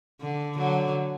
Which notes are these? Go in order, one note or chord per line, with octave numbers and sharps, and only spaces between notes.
D3
D3 F#3